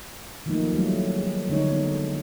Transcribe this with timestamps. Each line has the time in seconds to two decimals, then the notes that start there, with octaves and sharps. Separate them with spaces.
0.46 D#3 F3 F#3 A3 A#3 D#4
0.72 E3 F#3 G3 A3
1.16 G#4
1.49 D3 G#3 D4 D#4 F#4 C#5
1.70 B3 D#4